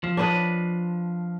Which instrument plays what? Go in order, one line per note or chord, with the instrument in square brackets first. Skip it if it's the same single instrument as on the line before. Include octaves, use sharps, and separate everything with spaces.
[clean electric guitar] F3
[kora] D4 B4 D#5